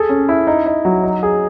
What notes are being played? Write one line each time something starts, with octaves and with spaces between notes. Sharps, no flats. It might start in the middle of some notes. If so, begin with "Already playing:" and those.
Already playing: G#4 A4
C#4
E4
D#4
D#4
F#3
D#4
G#4